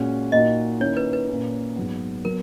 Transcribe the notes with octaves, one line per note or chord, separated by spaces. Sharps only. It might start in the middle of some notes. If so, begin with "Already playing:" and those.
Already playing: A#2 G#3 C#4 F#4
A#2 A#3 D#4 F#4 D#5
D#3 A#3 C#4 E4 C#5
B4
B4
A#2 A#3 C#4
G#2 F#3 B3
F#3 B3 A#4